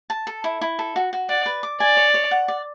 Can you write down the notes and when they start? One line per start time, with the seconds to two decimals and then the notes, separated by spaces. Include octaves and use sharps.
0.10 A5
0.27 A4
0.44 E4
0.61 E4
0.79 A4
0.96 F#4
1.13 F#4
1.29 D5 F#5
1.46 B4
1.63 D6
1.80 D5 G#5
1.96 C#5
2.14 C#5
2.31 F#5
2.48 D5